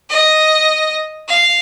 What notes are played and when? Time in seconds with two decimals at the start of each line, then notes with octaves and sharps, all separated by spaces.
0.10 D#5
1.28 F5